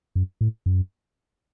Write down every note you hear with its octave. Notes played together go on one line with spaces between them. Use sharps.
F#2
A2
F#2